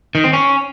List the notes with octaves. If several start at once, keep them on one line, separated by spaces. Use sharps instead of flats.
D#3
C4
C#4